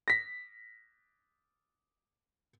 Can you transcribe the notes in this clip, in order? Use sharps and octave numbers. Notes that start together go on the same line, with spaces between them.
A#6 B6